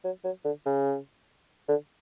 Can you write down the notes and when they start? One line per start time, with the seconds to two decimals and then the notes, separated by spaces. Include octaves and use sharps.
0.04 F#3
0.24 F#3
0.45 D3
0.66 C#3
1.69 D3